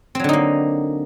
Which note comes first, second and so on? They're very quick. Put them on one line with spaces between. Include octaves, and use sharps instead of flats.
C4 F#3 D3 D#4 A#3